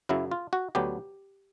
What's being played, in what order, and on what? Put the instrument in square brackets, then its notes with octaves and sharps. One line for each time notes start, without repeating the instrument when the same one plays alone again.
[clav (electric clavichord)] F#2 C#3 F#3 E4
F4
F#4
D2 D3 F#3 B3 G4